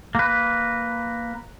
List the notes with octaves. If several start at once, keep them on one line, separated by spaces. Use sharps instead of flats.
A#3 B4